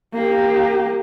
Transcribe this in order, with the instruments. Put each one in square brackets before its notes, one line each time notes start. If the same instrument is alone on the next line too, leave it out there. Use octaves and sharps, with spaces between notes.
[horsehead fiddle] A#3 G4